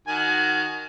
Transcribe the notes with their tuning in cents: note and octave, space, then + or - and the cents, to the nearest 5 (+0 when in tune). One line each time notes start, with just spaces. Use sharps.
D#3 -5 F#4 +0 G#5 +35